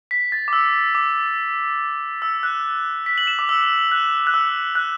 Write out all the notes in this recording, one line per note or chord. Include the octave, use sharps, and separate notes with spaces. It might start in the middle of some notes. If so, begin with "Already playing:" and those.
B6
A6
D6
E6
D6
E6
F#6
B6
F#7
E7
D6
E6
F#6
F#6
E6
F#6